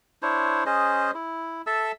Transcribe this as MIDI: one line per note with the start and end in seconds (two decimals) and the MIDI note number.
0.22 0.64 62
0.22 0.64 64
0.22 0.64 72
0.22 0.64 73
0.66 1.11 61
0.66 1.11 68
0.66 1.11 72
0.66 1.11 75
1.15 1.62 64
1.67 1.92 69
1.67 1.92 76
1.67 1.92 81
1.67 1.92 88